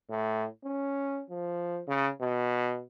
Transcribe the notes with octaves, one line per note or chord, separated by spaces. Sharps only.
A2
C#4
F3
C#3
B2